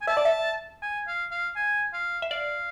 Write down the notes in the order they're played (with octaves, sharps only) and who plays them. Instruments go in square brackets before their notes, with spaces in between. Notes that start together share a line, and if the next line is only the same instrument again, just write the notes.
[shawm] G#5
[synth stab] E5 [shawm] A5
[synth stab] D5
E5
[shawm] G#5
F5
F5
G#5
F5
[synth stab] E5
[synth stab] D5 [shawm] F5